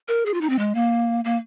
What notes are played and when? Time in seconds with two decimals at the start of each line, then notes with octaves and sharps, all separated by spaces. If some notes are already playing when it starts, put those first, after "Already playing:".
0.08 A#4
0.26 G#4
0.34 F4
0.41 D#4
0.50 C4
0.59 G#3
0.75 A#3
1.25 A#3